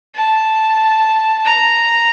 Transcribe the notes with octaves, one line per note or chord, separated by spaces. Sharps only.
A5
A#5